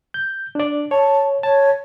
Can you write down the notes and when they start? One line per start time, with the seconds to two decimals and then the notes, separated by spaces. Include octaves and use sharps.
0.14 G6
0.55 D4 D5
0.91 C#5 A5
1.43 C#5 A5